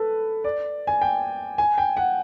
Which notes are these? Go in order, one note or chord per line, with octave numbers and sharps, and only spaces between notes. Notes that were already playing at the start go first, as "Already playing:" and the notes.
Already playing: A4 B4
D5
G#5
G5
G#5
G5
F#5